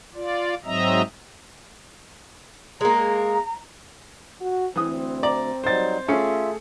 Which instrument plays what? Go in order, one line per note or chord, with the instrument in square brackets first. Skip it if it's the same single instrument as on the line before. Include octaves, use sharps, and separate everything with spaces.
[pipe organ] F4 D5
G#2 F#3 C4 D#5 E5 A#5
[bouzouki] G#3 A#3 [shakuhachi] A#5
[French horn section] F#4
[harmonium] D2 [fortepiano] E3 D#6 [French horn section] C4
[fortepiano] D5 [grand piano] A#5
[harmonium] F#3 G3 D#4 [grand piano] C5 A6
[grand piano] A3 G#4 C#7 [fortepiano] C#4 [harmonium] F4 E5